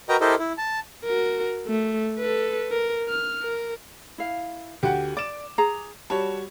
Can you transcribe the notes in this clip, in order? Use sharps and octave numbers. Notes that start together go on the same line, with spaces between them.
F#4 A#4 B4 D#5 G5 A#5
E4 G4 A4 A#4 C5 D#5
E4
A5
F#4 A#4
A3
A4 B4
A#4
F6
A#4
E4 F5
D2 F#4 G4 F#5
D5 D6 E7
G#4 A#5
G3 F#4 C#5 A5